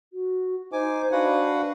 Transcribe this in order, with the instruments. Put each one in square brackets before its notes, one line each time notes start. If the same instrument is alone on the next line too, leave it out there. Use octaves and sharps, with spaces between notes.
[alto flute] F#4
[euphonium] D#4 [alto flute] C5 [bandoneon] G#5 D6
[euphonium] D4 [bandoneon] F#4 B4 F#5 [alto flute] F5